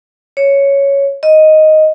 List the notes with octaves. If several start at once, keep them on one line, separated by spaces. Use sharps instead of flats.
C#5
D#5